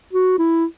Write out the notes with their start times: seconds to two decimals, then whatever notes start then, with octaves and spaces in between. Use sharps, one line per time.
0.13 F#4
0.38 E4